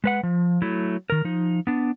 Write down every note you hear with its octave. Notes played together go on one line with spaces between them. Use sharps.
G#3 B4 F#5
F3
F#3 A3 E4
D#3 A#4
F3 D#4
B3 D4